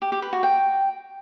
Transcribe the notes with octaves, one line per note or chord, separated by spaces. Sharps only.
G4
G4
B4
F#4
G5